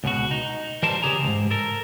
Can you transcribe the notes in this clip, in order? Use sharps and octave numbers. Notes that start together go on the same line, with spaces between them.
C#2 B2 F#4
D#4
E3 G3 A#4 C5 A5
C#3 G4 G#4 A#5
C#2 G#2
A4 A#4